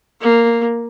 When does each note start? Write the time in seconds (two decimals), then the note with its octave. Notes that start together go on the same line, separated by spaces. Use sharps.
0.21 A#3